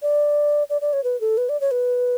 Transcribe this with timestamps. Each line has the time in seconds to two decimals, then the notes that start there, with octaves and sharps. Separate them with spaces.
0.02 D5
0.70 D5
0.81 D5
0.93 C#5
1.04 B4
1.21 A4
1.38 B4
1.49 D5
1.61 C#5
1.71 B4